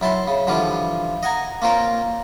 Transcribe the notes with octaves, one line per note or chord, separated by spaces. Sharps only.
F#2 E4 A5 C6
C#3
D3 E3 F3 G3 F4
D#5 F#5 G#5 A#5
A#3 C4 C#4 F4 A#4 G5